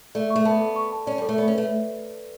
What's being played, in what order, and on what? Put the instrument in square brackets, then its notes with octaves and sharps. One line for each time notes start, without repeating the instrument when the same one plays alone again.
[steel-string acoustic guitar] A3 [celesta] D5
[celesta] C#6
[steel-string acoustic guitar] A3
[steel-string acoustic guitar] B3 [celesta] A5
[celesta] A4
C#6
A5
[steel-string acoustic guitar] C#4 [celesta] D5
[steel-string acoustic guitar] G3 [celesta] A4
[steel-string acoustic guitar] A3
[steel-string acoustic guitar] B3 [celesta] D5
[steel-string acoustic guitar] C#4
[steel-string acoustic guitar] A3 [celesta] B4